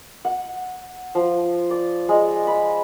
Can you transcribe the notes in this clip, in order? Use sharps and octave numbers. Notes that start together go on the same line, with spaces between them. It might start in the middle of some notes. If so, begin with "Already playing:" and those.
F#5
F3
D5
G#3
B5